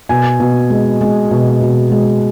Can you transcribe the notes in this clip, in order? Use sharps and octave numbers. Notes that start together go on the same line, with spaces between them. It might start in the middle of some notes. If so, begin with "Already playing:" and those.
B2 G#5
B2
G#3
G#3
B2
B2
G#3